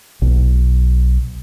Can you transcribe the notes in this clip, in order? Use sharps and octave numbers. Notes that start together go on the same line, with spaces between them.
B1